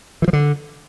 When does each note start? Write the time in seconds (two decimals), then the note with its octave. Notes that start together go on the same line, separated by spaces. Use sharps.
0.22 E3
0.28 F3
0.33 D3